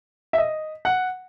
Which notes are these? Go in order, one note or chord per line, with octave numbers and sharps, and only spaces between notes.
E5
D#5
F#5